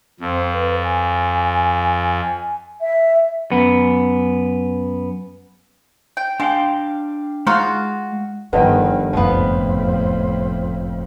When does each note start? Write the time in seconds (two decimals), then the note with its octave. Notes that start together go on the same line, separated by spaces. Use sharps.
0.20 F2 C4
0.54 B4
0.84 G#5
2.82 E5
3.52 F#2 B3
6.17 G5
6.40 G#3 D4 F5 G5
7.47 G#3 D#4 F4 F#4 F5
8.53 G1 D3 D#3 F3 B4 D#5 G5
9.13 F#1 C2 F2 A2 F3 B3